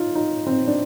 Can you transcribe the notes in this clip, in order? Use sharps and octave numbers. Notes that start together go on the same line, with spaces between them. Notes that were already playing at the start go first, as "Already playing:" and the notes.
Already playing: D#4 F4
D#4
C4
D4